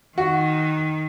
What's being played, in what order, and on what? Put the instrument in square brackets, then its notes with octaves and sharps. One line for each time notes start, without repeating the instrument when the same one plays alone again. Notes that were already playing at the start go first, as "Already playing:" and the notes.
[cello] D#3 [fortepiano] F#4